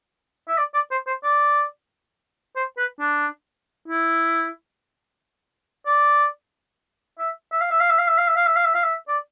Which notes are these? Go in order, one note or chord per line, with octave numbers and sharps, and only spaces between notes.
E5
D5
D5
C5
C5
D5
C5
B4
D4
E4
D5
E5
E5
F5
E5
F5
E5
F5
E5
F5
E5
F5
E5
F5
E5
F5
E5
D5